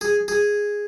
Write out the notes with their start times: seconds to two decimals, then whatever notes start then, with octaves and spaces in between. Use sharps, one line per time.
0.01 G#4
0.28 G#4